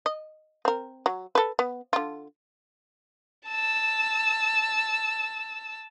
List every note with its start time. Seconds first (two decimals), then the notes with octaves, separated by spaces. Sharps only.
0.06 D#5
0.65 C4 A#4
1.06 F#3
1.35 A4 B4
1.59 B3
1.93 D3 F4
3.48 A5 E6